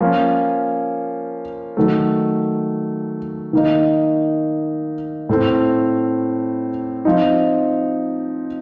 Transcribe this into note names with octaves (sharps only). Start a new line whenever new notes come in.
F3 A#3 C#4
D#3 F#3 A3
D#3 A#3 D#4
A2 A3 C4
F3 C4 D#4